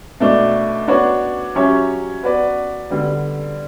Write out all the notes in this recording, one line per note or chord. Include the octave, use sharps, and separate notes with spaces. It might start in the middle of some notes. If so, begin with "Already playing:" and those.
B2 A3 D4
B3 D4 F#4 C#5
F#3 C#4 G4 C#5 E5
B3 F#4 B4 D5
D3 G3 B3